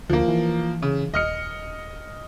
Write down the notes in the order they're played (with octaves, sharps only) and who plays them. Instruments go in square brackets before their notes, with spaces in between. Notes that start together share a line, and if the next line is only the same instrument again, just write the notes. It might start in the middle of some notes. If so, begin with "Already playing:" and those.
[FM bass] D2 [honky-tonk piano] F3 A#3
[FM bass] E3
[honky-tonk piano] C#3
[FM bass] D#1 [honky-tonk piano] D#5 F6 C#7